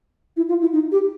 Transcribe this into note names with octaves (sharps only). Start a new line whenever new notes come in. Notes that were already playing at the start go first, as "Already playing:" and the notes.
E4
F4
E4
D#4
G4